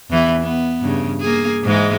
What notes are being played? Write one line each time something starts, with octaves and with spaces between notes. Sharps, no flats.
E2 E3 E4
B3
G2 C#3
A#3 G#4
G#2 E3 G#3